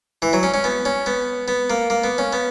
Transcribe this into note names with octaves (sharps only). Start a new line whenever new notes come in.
E3
F#3
C#4
C#4
B3
C#4
B3
B3
A#3
A#3
B3
C#4
B3